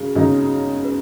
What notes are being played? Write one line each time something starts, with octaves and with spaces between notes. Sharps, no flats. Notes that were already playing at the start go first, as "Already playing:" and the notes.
Already playing: F#2 C#3 G#4
F#2 C#3 F#3 D#4
B4